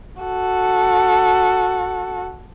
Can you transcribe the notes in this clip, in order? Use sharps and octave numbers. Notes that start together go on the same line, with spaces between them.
F#4 A4